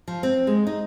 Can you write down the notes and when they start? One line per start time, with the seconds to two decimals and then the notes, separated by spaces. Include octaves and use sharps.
0.08 F3
0.23 C4
0.47 G#3
0.67 D#4